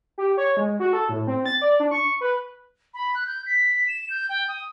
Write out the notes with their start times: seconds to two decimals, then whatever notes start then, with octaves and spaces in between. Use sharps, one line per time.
0.18 G4
0.37 C#5
0.57 G#3
0.80 F#4
0.93 A4
1.09 A2
1.27 C4
1.46 A6
1.61 D5
1.80 D4
1.91 C#6
2.21 B4
2.94 B5
3.15 F#6
3.27 G6
3.46 B6
3.88 E7
4.10 G6
4.29 G5
4.49 D#6